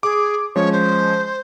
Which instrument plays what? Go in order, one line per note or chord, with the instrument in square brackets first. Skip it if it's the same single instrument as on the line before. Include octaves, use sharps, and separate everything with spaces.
[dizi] G#4 [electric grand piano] D6
[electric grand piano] F3 G#3 C#4 [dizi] C#5
[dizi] C5